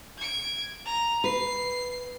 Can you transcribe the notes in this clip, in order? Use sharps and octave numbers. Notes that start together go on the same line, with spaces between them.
G#6 D7
A#5
B4 C7